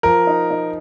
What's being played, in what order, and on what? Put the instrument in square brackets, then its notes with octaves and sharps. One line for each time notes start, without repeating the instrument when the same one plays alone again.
[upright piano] F3 [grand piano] A#4
[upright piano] D#4
D#4